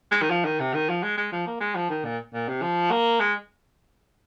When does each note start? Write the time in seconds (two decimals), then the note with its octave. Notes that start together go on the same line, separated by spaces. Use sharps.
0.12 G#3
0.22 D#3
0.31 F3
0.45 D#3
0.60 C3
0.74 D#3
0.89 F3
1.03 G#3
1.18 G#3
1.32 F3
1.47 A#3
1.60 G#3
1.75 F3
1.90 D#3
2.05 A#2
2.34 A#2
2.49 C3
2.62 F3
2.91 A#3
3.20 G#3